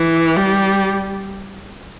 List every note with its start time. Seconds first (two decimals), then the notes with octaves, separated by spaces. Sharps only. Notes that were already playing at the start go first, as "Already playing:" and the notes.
Already playing: E3
0.37 G3